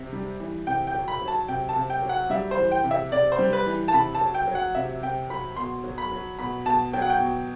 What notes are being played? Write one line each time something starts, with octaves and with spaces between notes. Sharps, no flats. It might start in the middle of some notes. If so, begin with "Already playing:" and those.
Already playing: C3
G3
E3
C3 G5
G5
F#3
B5
F#3
A5
C3 G5
A5
C3
G5
F#3
F#5
G3 E5
C5
E3
G5
C3
E5
C3 D5
C5
G3
B4
E3
A5
C3 B5
A5
F#3
G5
F#3
F#5
C3 E5
C3 G5
F#3 B5
B2 C6
F#3
B5
F#3
B2 B5
B2 A5
F#3 G5
F#5
G5
B2